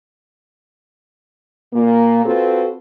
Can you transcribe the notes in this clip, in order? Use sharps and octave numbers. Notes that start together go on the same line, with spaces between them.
A#2 A#3
C4 F4 F#4 A4 B4